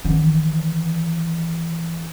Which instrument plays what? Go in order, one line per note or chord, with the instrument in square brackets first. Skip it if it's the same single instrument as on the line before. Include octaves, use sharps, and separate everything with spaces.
[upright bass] D#3 E3